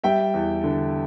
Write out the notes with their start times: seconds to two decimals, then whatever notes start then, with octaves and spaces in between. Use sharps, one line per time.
0.04 G3 E5 G5
0.34 E2
0.64 D3